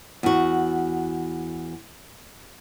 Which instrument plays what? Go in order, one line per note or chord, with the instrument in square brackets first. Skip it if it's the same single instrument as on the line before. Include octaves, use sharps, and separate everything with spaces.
[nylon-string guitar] E2 F#4